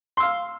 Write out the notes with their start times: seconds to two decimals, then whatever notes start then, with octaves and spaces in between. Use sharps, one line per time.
0.17 C6
0.20 E6
0.23 F5